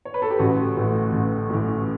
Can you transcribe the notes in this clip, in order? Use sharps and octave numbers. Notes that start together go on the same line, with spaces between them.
C#5
B4
A4
G4
A1 F#4
A2 E3
A1
A2 E3